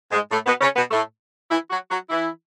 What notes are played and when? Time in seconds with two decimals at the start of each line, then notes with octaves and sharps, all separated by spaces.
0.11 G#2 G#3
0.31 A2 A3
0.46 B2 B3
0.61 C#3 C#4
0.76 B2 B3
0.91 A2 A3
1.50 E3 E4
1.71 F#3 F#4
1.90 F#3 F#4
2.10 E3 E4